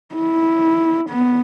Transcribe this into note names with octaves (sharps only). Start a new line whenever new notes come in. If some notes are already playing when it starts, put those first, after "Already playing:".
E4
B3